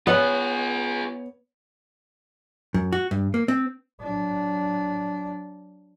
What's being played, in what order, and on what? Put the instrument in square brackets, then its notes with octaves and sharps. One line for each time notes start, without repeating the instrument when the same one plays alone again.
[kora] B3 [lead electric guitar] F4 G#4 [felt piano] C#5
[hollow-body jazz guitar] F#2
F#4
G2
A#3
C4
[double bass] F#3 D4